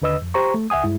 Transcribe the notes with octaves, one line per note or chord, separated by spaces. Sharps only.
D#2 D3 B4 D#5 E6
F2
G4 C5 A#5 C#6
A3
C#2 E5 F#5 G#5 D#6
G2 G#3 E4